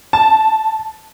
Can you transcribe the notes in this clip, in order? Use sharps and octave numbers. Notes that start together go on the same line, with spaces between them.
A5